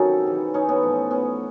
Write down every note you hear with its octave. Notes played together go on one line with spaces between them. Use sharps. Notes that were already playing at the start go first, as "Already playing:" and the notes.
Already playing: C3 D#3 F#3 C#4 D#4 A4
C#3 E3
C#4 D#4
B3 C#4
A2 F3
B3 C#4